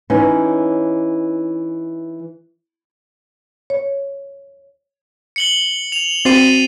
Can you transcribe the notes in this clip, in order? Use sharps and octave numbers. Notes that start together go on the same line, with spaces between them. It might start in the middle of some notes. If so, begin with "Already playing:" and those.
E3 C#4 D#4
C#5
C#7 F#7 G7
F7
C4 F#4 C5 A6 C7 D#7